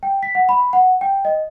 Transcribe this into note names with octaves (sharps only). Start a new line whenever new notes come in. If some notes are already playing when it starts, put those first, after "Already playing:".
G5
B6
F#5
B5
F#5
G5
D#5